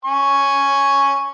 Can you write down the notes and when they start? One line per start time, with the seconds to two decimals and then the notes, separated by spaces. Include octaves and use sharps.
0.05 G#5 C#6